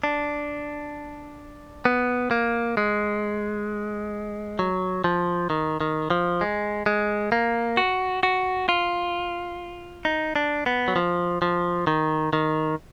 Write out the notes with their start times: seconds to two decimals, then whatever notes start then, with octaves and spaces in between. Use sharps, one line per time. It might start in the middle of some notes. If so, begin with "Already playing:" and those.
0.04 D4
1.85 B3
2.31 A#3
2.77 G#3
4.59 F#3
5.04 F3
5.50 D#3
5.81 D#3
6.10 F3
6.41 G#3
6.86 G#3
7.32 A#3
7.77 F#4
8.23 F#4
8.69 F4
10.05 D#4
10.36 D4
10.66 B3
10.88 F#3
10.96 F3
11.42 F3
11.87 D#3
12.33 D#3